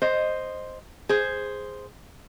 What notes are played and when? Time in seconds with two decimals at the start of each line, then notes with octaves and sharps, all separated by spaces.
0.02 C5 D#5
1.09 G#4 C5